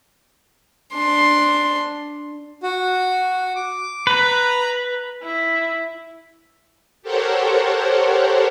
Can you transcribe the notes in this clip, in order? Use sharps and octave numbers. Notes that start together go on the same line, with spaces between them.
D4 C6
F#4
D6
B4 A#5 B5
E4
G4 A4 A#4 C5 C#5 F#5